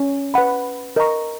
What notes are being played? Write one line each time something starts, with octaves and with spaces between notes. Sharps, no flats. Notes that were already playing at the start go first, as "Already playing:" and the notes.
Already playing: C#4
B4 F#5 B5
A#4 D#5 A#5 C#6